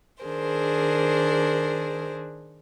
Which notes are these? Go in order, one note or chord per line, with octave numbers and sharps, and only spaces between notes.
D#3 D4 G#4 A#4 C5